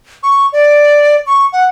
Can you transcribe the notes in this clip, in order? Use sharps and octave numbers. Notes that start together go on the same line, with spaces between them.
C#6
D5
C#6
F#5